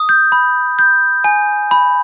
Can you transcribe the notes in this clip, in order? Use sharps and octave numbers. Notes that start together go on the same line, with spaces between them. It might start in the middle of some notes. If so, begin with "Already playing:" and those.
Already playing: D#6
G6
B5
G6
G#5
B5